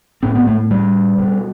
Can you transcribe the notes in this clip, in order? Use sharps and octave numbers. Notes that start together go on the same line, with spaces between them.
A2 C4
B3
A3
G3
B2